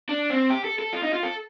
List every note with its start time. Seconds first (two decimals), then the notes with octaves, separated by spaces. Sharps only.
0.09 D4
0.30 C4
0.50 G4
0.64 A4
0.79 A4
0.93 F4
1.03 D#4
1.13 F4
1.23 A4